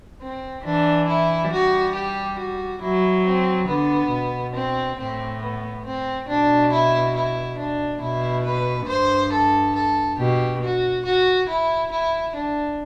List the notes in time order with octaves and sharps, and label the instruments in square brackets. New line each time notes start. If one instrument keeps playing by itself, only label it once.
[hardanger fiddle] C4
[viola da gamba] E3 [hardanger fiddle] D4
[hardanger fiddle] E4
[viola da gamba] G3 [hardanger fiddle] F#4
[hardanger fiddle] G4
F#4
[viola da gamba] F#3 [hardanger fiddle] E4
[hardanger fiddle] C4
[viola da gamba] D3 [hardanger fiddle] B3
[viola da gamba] B2
[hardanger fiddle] C4
[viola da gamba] A2 [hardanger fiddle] C4
[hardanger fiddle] B3
C4
[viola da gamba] B2 [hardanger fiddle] D4
[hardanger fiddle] E4
E4
D4
[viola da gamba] B2 [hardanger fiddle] E4
[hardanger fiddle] B4
[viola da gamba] G2 [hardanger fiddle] C5
[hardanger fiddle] A4
A4
[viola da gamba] B2 [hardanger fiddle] G4
[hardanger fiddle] F#4
F#4
E4
E4
D4